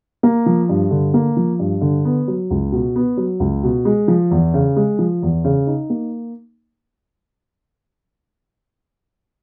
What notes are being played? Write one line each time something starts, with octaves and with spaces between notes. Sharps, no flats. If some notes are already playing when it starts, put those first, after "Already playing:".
A#3
F3
G2
D3
A#3
F3
G2
D3
B3
F#3
C#2
B2
B3
F#3
C#2
B2
G#3
F3
E2
C#3
G#3
F3
E2
C#3
D#4
A#3